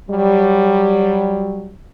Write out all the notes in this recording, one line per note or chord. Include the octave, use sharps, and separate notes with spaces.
F#3 G3